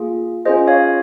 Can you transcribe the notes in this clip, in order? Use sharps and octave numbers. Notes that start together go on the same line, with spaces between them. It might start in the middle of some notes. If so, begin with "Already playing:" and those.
Already playing: A#3 F4 G#4
C#4 F4 G#4 C5 D#5
C#5 F5